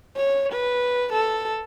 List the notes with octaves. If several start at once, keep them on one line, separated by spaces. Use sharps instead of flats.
C#5
B4
A4